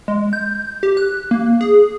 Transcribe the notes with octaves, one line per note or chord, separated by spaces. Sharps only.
G#3
G6
G4
F#6
A#3
G#4